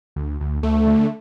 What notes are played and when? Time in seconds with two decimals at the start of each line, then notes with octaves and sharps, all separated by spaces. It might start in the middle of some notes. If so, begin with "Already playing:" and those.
0.16 D2
0.40 D2
0.63 D2 A3
0.87 D3